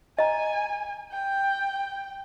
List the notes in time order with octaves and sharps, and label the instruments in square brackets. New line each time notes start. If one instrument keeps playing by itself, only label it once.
[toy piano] D#5 A#5 [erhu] G#5
[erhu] G5